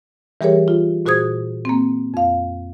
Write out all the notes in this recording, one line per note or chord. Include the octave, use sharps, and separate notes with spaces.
E3 G3 G4 G#4 A#4 C#5
F4
A#2 F#4 G#4 C5 D#6 G#6
A#3 C4
F2 F5